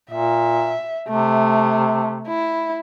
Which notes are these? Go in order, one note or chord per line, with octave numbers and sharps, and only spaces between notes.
A#2 E5
C3 A3
E4